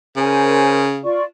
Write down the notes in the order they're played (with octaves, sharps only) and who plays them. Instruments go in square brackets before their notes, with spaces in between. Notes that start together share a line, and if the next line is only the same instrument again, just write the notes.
[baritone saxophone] C#3 [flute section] A#4 C5 G#5
[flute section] F4 D5 C#6